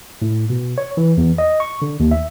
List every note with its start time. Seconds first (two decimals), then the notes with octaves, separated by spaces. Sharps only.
0.22 A2
0.50 B2
0.78 C#5
0.97 E3
1.18 E2
1.38 D#5
1.60 C#6
1.82 D3
2.00 D#2
2.11 E5